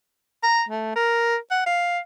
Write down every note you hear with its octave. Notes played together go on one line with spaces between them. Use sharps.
A#5
A3
A#4
F#5
F5